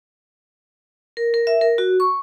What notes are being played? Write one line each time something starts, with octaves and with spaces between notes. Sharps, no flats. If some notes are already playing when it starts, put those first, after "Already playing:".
A#4
A#4
E5
A#4
F#4
C#6